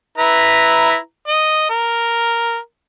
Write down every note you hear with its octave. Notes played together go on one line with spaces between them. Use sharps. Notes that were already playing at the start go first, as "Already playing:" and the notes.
E4 B4 A#5
D#5
A#4